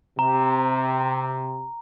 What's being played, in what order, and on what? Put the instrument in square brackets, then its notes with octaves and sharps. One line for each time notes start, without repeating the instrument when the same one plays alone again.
[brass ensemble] C3 [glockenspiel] A#5